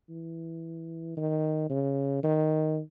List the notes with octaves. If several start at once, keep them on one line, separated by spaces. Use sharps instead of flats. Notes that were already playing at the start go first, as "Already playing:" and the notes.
E3
D#3
C#3
D#3